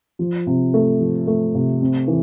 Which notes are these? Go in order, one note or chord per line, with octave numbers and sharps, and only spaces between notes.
F3
C3
A3
F3
A3
C3
C4
E3